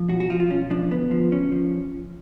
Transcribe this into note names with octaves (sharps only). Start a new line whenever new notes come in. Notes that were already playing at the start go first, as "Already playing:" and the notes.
Already playing: F3
B1 F#4
F#4
F3 F4
F4
B1 C#4
F3 D4
D2 B3
F3
D2 C#4
F3